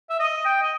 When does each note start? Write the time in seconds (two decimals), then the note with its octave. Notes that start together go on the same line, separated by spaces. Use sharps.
0.10 E5
0.20 D#5
0.45 G5
0.62 D#5